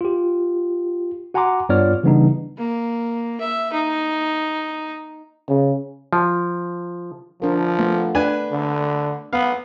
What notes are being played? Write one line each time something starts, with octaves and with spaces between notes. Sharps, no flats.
F4 G4
F#4 F#5 G#5 A#5 C6 D6
G2 B3 F4 C#5 D5 F6
C#3 E3 G3 B3 D4 D#4
A#3
E5
D#4
C#3
F3
F3 D4 A#4
A3 B3
D4 B4 G#5
D3
B3 F5